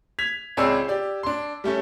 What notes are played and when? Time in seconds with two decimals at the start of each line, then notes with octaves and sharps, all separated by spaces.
0.19 G#6 B6 F7
0.57 C#2 C4 G#4 C#5 D5 E6
0.88 G4 D5
1.23 D4 C6
1.64 G3 A3 C#4